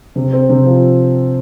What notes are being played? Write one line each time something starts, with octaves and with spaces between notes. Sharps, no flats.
C3
C4
C3
F3